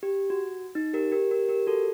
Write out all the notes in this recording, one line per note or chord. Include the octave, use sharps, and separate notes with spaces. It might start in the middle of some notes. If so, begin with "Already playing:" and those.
G4
F#4
D#4
G4 A#4
G4 A#4
G4 A#4
G4 A#4
F#4 A4